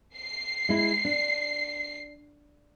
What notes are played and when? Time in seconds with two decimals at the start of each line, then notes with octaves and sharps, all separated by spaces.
0.17 C7
0.69 G#3 E4
1.05 D4